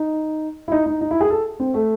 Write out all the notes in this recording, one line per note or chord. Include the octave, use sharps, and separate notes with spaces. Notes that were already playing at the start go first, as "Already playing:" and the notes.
Already playing: D#4
E4
D#4
D#4
D#4
E4
G#4
A4
C4
A3